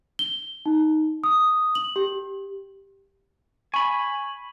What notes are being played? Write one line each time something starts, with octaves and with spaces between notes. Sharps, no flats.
G7
D#4
D#6
F#7
G4
G#5 B5 C#6